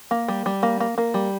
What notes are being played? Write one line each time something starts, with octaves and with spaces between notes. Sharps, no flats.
A#3
G3
G3
A#3
A#3
A#3
G3